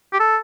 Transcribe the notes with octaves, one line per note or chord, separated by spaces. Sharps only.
G4
A4